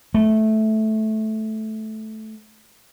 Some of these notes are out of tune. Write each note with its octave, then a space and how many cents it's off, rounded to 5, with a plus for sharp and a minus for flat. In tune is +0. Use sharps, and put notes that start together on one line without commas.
A3 -10